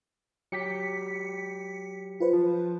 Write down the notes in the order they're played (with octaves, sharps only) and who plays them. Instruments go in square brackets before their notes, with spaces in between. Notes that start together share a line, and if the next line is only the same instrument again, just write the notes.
[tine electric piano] F#3 G4 G5 [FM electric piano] B6 C#7
[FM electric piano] F4 B4 C5
[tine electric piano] F3